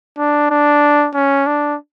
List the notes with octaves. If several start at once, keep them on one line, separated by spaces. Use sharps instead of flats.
D4
D4
C#4
D4